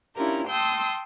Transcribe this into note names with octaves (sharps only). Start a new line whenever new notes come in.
C#4 D4 E4 F4 G4 A#4
G5 A5 C6 D#6 E6 G6